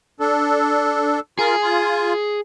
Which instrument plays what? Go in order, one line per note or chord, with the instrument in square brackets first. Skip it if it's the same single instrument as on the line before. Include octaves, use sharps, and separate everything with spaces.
[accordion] D4 A4
[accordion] F4 A#4 [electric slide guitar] G#4
[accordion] F4